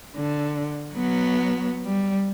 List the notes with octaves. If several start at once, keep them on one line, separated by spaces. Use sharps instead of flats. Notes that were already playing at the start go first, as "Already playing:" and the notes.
D3
F#3 B3
G3